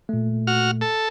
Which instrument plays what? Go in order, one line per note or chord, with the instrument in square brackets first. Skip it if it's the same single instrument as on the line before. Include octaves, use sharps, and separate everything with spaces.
[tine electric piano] A#2 A3
[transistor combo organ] F#4 F6
A4